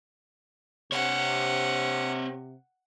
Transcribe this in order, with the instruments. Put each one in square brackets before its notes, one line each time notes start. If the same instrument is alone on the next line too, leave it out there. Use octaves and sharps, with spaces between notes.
[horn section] C3 [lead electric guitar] C4 C#5 [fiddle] F#5